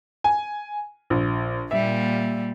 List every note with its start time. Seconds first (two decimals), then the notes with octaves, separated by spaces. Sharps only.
0.24 G#5
1.10 A#1
1.71 A#2 G3 A#3 E5